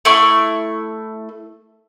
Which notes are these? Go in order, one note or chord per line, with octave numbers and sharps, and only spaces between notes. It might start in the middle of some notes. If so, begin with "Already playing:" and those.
A3 E4 C#6